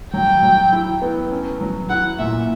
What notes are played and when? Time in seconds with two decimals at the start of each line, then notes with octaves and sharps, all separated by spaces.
0.14 F#3 G5
0.43 F#3
0.72 E4
1.02 B3
1.31 C#4
1.61 F#3
1.90 E4 F#5
2.19 A#2 E5